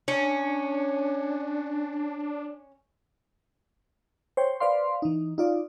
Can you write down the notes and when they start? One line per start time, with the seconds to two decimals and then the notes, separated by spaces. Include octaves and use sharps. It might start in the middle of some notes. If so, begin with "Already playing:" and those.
0.08 C#4 D4
4.37 C5 C#5 G5
4.60 B4 C5 D5 F5 C6
5.02 E3 D#4
5.38 D#4 F4 D5